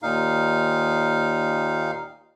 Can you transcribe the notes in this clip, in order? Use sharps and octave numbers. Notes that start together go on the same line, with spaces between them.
D#2 A#2 D#4 F5